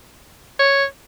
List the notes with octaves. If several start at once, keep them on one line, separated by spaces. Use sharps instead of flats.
C#5